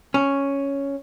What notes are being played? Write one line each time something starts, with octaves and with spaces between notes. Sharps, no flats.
C#4